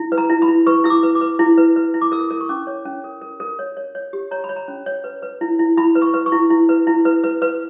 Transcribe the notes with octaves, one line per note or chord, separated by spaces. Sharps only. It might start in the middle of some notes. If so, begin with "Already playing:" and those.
Already playing: E4
B4
A#5
E4
B5
E4
B4 C#6
E4 E6
D6
B4
D6
B4
E4
B4
B4
E4
D6
A#4 E6
A#4
C#6
C#4 D6
C#5
C#4
A#4
A#4
A#4
C#5
C#5
C#5
G4
C#5 A#5
B5
C#5
A#5
C#4
C#5
B4
B4
E4
E4
E4 B5
B4
C#6
B4
C#6
E4
E4
B4
E4
B4
B4
B4